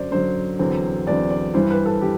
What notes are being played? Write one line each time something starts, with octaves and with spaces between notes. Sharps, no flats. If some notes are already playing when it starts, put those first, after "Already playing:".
Already playing: F#2 D3 F#3 C5 D5
F#2 D3 F#3 C5
E2 D3 F#3 C4
E2 D3 F#3 C4 D5
D5
G2 E3 G3 C5
B4
A4
E3 G4